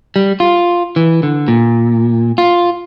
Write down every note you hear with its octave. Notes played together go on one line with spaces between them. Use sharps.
G3
F4
E3
D3
A#2
F4